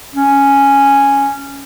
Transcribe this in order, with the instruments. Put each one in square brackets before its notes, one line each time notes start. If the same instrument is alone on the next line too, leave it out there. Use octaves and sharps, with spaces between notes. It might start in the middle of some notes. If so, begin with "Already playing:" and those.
[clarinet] C#4